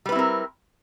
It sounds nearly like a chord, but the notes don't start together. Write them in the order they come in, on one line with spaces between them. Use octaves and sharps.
G3 B4 E4 C4 A#4